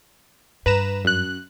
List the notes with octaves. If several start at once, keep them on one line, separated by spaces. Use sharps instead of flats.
G2 B4 A#5 E7
F#2 F#6